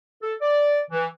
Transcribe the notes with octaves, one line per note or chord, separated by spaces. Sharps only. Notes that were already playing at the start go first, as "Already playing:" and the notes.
A4
D5
E3